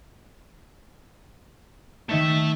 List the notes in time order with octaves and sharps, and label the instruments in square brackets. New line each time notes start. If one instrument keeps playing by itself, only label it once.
[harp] D#3 D#4 G#6 [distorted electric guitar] A3 E5